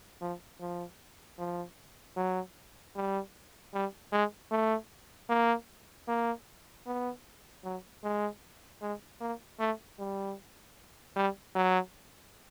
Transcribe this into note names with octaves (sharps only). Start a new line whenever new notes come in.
F3
F3
F3
F#3
G3
G3
G#3
A3
A#3
A#3
B3
F#3
G#3
G#3
A#3
A3
G3
G3
F#3